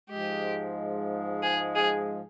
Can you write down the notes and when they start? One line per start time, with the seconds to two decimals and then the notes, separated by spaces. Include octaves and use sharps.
0.10 G#2 F3 G#3 G4
1.43 G#4
1.75 G#4